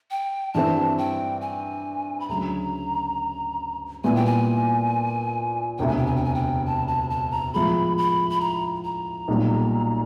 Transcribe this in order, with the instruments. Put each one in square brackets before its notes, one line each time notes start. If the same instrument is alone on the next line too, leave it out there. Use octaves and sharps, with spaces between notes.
[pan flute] G5
[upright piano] G2 E3 G3 C4 [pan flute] A5
[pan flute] G5
G#5
B5
[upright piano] D2 C#3 F#3 [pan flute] A#5
[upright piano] A#2 G3 B3 E4 [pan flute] G#5
[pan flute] G5
G#5
[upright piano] E1 D2 C3 [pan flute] G5
[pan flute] G#5
G5
G#5
G5
G#5
G5
A5
A5
A5
A#5
[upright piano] A2 F3 G#3 B3 [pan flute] B5
[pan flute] B5
B5
A#5
A#5
[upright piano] B1 A#2 G3